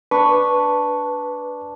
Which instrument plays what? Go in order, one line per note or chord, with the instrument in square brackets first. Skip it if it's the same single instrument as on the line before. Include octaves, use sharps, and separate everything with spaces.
[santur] D4 [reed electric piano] B4 C#6